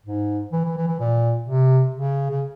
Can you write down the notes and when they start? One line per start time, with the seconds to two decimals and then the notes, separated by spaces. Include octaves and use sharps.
0.06 G#2
0.53 E3
0.65 E3
0.77 E3
0.88 E3
1.00 A#2
1.48 C3
1.95 C#3
2.31 C#3